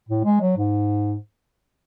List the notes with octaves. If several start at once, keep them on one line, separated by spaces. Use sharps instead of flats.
A2
G#3
F#3
G#2